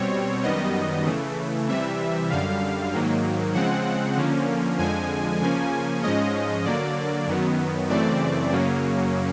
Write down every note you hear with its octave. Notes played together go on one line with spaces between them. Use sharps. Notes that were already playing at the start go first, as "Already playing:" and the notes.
Already playing: B2 G3 C4 C#5
F#2 D#3 G3 B3 D#5
C#3 E3 A3
C3 E3 G3 E5
F#2 D3 G3 F5
G#2 D#3 F#3 A#3
C#3 F3 G#3 C4 F#5
D3 F3 A#3 C#4
F2 D3 F3 G#3 G#5
C#3 F3 A#3 C#4 G#5
G#2 F3 G#3 C#4 D#5
D3 F#3 A#3 D5
F#2 D#3 F#3 B3
F#2 C#3 E3 A3 C4 D5
F#2 C#3 F#3 A#3 C#4